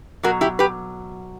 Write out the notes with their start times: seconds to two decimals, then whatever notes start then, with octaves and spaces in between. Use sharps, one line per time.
0.23 B2 F#3 F#4 A#4
0.41 E4 G4
0.59 G4 B4